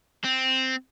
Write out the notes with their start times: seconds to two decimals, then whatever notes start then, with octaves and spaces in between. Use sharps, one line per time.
0.24 C4